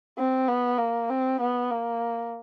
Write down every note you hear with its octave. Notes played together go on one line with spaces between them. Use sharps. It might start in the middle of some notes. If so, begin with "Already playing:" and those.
C4
B3
A#3
C4
B3
A#3